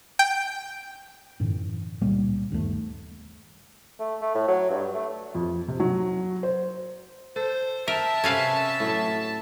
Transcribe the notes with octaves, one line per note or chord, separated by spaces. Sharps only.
G5
F#2 A2 D3 E3
C#2 A#2 G3 A#3
G1 D#2 A#2 A3
A3
A3
A2
F#3
G2
A3
F2
C3
F#3
C5
A4 C5
A#4 E5 A5
C3 C#4 A4 B4 F5
A2 F#3